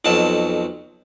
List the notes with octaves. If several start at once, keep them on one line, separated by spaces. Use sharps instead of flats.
B1 F2 F#3 A5